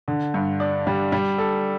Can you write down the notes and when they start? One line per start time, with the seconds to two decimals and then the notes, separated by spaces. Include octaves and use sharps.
0.08 D3
0.34 G2
0.60 D4
0.87 G3
1.12 G3
1.38 A4